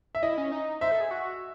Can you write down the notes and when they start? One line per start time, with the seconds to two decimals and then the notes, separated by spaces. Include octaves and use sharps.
0.15 E5
0.23 E4 D#5
0.38 C#4
0.52 D#4
0.81 C5 E5
0.92 A4
1.01 G#4
1.11 F#4